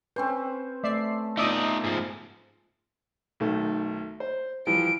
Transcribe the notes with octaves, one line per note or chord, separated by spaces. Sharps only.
C4 C#4 B4 C5
A3 D5 E5 C7
B3 D#4 F4 D5 E5 D#6
G#2 F3
B1 D#3 A3
C5
E3 F3 G3 D7